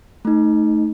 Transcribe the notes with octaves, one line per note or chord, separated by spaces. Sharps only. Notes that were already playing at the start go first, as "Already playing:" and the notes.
A3 D#4